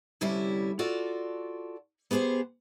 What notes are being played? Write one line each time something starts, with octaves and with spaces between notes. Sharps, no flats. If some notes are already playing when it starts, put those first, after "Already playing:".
D2 C3 G3 C#4 E4 E5
F4 F#4 A4 D5
B3 G4 G#4 B4 C5